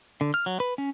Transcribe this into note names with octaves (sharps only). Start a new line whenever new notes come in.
D3
F6
F#3
B4
C#4